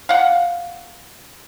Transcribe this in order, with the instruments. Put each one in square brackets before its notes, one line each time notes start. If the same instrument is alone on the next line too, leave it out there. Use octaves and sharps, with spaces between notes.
[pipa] F5 F#5